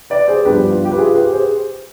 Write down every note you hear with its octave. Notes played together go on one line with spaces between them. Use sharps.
B4 D5
G#4 C5
G2 F3 B3 D4 G4 B4
F4
G4
B4
F4 G#4
G4 B4
G#4 C5